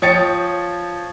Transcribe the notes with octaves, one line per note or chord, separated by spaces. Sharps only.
F3 C#5 G5 D#6 A6 C#7